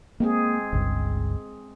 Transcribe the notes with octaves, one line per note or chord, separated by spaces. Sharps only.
G#3 A#3 C4 G#4
G1 C#2 G2